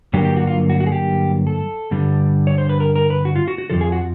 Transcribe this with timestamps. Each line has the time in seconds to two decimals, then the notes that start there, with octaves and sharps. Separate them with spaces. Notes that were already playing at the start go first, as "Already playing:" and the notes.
0.13 G2 D3 F#3 A#3 G4
0.25 G4
0.36 F#4
0.47 F4
0.70 F#4
0.80 F#4
0.87 G#4
0.92 G4
1.47 A4
1.91 G2 D3 G3
2.47 C#5
2.58 C5
2.69 B4
2.80 A#4
2.96 A#4
3.10 B4
3.25 F#4
3.36 F4
3.48 F#4
3.58 F#4
3.70 F2 C3 F3 A4
3.81 G#4
3.92 F#4